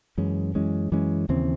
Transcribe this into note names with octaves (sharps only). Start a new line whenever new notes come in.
F#2 E3 G#3 C#4
F#2 E3 G#3 C#4
F#2 E3 G#3 C#4
D#2 C#3 E3 C4